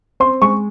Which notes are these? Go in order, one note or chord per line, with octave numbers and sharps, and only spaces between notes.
C4 C6
G#3 C#6